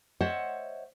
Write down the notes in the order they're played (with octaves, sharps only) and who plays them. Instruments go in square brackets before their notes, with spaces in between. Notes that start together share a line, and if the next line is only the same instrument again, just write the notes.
[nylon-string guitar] C5 C#5 D#5 E5 F#5